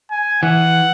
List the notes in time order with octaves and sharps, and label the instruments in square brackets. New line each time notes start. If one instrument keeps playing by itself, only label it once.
[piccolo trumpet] G#5
[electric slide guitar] E3 [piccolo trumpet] F#5